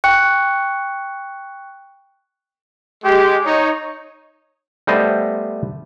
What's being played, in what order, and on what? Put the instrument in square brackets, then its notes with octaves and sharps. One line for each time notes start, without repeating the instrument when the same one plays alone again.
[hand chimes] G5 C#6 F#6 C#7
[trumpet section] G#3 G4
D#4 C#5
[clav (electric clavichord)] G3 A3 B3 C5 D#5